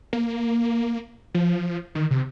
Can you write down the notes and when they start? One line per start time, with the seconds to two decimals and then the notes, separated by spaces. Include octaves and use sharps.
0.13 A#3
1.34 F3
1.95 D#3
2.11 C3